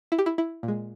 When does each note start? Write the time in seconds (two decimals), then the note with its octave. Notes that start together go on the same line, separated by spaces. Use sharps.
0.12 E4
0.19 G4
0.26 E4
0.38 E4
0.63 A#2
0.68 G#3